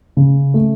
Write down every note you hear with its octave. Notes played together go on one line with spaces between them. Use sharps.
C#3
A3